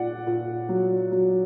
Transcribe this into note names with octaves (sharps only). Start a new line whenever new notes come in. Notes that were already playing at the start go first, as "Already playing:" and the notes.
Already playing: A#2 D5 F#5
A#2
F#3
F#3